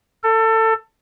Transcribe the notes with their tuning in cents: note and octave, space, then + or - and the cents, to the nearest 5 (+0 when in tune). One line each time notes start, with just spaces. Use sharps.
A4 +25